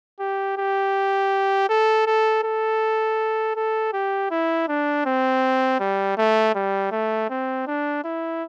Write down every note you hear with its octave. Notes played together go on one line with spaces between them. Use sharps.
G4
G4
A4
A4
A4
A4
G4
E4
D4
C4
G3
A3
G3
A3
C4
D4
E4